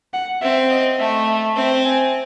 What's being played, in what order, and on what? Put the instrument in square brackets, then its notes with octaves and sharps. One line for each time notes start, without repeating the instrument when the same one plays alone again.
[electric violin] F#5
[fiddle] C4 [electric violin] E5
[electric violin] D#5
[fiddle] A3 [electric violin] E5
[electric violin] E5
[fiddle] C4 [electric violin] E5
[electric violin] G#5